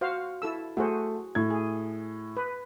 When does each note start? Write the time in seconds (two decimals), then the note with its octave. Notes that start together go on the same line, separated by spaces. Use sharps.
0.01 F#4 C5 F5
0.42 E4 A4 E6
0.77 A3 F#4 G#4 C5
1.35 A2 G#6
1.50 G#4
2.37 B4